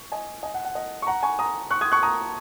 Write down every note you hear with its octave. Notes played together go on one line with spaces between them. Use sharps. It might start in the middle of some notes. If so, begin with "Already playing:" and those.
Already playing: C#6
D#5 G#5
D#5 G#5
F#5
F#5
D#5
C#6
F#5 A#5
G#5 C#6
A#5 D#6
C#6 F#6
D#6 G#6
C#6 F#6
A#5 D#6